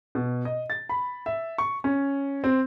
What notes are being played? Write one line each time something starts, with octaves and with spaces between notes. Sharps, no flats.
B2
D#5
A6
B5
E5
C#6
C#4
C4